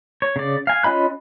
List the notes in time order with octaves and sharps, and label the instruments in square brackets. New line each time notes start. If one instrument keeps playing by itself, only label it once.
[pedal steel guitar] C#5
C#3 D5
F5 G#5
C#4 F4 D#5 B5 F#6